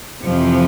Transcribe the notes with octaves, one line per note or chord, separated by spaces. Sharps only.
F2 C3 E3 F3